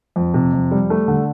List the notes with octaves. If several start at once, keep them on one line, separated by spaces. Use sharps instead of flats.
F2
C3
F2
G3
A3
D3